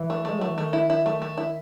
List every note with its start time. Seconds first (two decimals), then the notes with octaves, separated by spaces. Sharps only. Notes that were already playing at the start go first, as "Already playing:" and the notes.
Already playing: E3
0.10 A3
0.25 G#3 A3
0.39 F#3 A3
0.48 E3
0.58 D#3 A3
0.73 E4
0.90 E4
1.06 A3
1.22 A3
1.38 E4